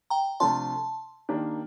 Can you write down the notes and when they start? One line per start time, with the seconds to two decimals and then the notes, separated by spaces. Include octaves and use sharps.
0.10 G5 A#5
0.40 C3 F3 A3 D4 F4 A5 C6
1.29 D#3 A#3 D4 G4